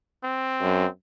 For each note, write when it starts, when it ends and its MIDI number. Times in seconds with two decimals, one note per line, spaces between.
0.24 0.88 60
0.61 0.85 42